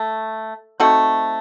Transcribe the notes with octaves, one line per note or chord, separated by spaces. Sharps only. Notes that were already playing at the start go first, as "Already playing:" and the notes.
Already playing: A3
A3 C4 D#4 F#4